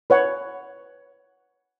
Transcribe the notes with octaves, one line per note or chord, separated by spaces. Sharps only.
B4 C#5 F#5